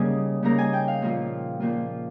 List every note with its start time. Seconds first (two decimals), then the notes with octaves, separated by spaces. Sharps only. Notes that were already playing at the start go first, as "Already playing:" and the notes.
Already playing: C#3 G3 A#3 D#4 G#5
0.43 C#3 G3 A#3 D#4 A#5
0.58 G#5
0.73 G5
0.88 F5
1.02 A#2 F3 A#3 F4
1.60 A#2 F3 A#3 F4